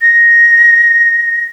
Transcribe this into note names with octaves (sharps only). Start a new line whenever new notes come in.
A#6